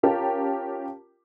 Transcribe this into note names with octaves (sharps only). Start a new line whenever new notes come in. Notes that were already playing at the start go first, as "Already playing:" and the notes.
C#4 F4 G4 A#4 A5